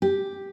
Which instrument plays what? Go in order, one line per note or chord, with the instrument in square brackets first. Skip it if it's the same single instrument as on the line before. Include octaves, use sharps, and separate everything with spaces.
[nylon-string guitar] G4